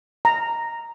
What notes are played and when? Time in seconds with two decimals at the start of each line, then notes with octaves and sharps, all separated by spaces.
0.25 A#5